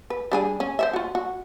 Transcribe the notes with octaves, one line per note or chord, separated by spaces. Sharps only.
B4
G3 D4 G#4
C#4
C5 C#5 E5
F4 F#4
F#4